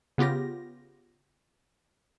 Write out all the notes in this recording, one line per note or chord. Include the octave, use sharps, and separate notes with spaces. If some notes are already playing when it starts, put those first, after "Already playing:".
C#3 B3 F4 G4 A#6